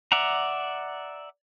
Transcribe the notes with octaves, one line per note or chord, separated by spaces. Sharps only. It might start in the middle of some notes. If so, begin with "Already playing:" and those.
D5 E5 F#5 A#5